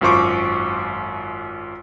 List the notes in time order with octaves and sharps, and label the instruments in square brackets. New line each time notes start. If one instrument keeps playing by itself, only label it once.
[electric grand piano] G#1 F#2 F4 C5 C#6 D6